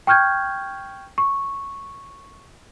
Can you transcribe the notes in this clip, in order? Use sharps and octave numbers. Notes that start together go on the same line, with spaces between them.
G5 C#6 F6 G6 G#6
C#6